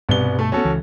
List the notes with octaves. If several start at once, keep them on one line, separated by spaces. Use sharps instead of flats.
C2 G2 B2 B3 G7
A3 A4
D2 B3 C#4 F#4 A4
C#2 E3